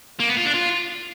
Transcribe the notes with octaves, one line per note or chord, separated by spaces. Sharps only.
A#3
B3
F4
D4
F4